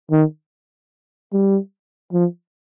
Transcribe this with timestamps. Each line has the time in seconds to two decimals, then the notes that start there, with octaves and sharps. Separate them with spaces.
0.11 D#3
1.33 G3
2.13 F3